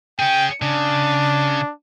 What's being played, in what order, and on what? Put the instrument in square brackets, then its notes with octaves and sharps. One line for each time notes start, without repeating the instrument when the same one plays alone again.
[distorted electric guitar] C#4 G#4 [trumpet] G5
[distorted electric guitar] C#3 [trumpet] D4